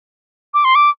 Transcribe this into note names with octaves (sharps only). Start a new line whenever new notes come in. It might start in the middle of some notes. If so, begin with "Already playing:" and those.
D6
C6
D6